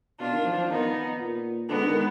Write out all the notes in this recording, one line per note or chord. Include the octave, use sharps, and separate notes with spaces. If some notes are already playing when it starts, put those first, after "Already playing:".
B2 D4 F4
D#3
F3
F3
D#3 B3 D#4
A#2
D3 G#3 B3
D#3